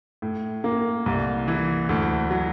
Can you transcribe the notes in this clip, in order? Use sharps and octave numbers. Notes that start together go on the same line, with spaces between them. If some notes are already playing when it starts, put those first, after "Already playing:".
A2
A#3
C2
E3
D2
F#3